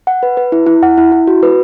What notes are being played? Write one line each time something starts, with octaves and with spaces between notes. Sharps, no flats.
F#5
B4
B4
E4
E4
F#5
E4
E4
F#4
B4